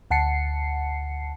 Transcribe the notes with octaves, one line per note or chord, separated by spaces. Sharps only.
D2 F#5 A5 C7 C#7